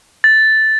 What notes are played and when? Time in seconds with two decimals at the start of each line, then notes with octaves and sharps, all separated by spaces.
0.24 A6